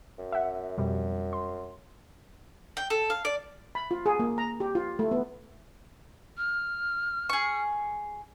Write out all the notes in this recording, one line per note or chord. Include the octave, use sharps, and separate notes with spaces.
F#2
E5 F#5
F2 B2 G3
C6
G5
A4
F5
D5
B5
F4
G#4
A#3
A#5
G4
F4
A3
B3
F6
G#4 C#6